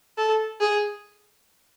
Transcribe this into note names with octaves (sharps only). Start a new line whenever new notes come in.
A4
G#4